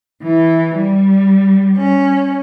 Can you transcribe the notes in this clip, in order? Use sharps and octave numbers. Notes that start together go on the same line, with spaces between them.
E3
G3
C#4